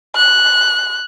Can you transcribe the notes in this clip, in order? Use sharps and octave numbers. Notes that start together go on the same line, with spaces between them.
F#6